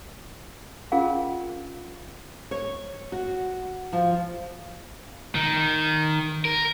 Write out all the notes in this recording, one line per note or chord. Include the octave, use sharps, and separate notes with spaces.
C#4 F4 G#4 A#4 F5 F#5
C#5
F#4
F3
D#3
A#4